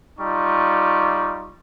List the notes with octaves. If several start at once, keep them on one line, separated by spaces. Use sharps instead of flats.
G3 D#4 F4 C#6